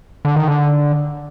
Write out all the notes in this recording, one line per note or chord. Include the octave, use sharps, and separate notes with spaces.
D3
D#3
D3